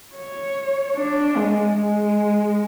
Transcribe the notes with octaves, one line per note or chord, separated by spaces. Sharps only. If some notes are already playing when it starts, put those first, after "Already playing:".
C#5
D4
G#3
G#3